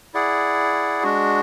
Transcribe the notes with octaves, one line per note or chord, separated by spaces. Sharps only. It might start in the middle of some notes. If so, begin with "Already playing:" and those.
E4 G#4 D5 F#5
G#3 D4 F#4